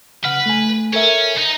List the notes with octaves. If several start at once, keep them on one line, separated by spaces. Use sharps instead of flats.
C#3 B4 F#5 F6
A3 G#5
C#4 A4 A#4 E5
D#4